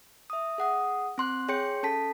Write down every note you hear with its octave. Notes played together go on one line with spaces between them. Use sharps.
E5 D#6
G#4 F#5 D#6
C4 C6 F#6
G#4 C#5 G5 C6 G6 C#7
C#4 A4 A5 B6